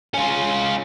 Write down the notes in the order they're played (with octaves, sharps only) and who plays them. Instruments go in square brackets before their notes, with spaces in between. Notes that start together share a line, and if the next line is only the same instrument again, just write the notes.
[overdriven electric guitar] C#4 F4